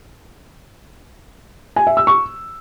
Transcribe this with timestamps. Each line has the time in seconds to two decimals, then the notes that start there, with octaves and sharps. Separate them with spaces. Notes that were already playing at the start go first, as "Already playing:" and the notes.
1.76 G#5
1.87 E5
1.97 E6
2.07 C#6